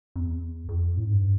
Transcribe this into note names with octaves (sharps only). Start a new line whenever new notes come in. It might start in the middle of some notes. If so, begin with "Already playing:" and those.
F2
E2
F2
A2
G#2
G2